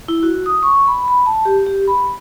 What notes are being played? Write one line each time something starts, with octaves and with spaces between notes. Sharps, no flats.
E4
F#4
D#6
C#6
B5
B5
A5
G4
G4
B5